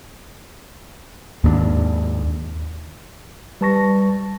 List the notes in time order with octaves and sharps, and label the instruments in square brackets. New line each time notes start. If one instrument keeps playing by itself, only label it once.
[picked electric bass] D#2 G#2 C4 D4
[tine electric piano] G3 B4 A5 C#6 A#6